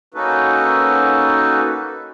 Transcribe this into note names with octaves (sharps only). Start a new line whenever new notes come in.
A#3 C#4 D#4 F#4 A4 B4